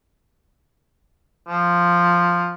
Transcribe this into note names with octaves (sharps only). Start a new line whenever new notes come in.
F3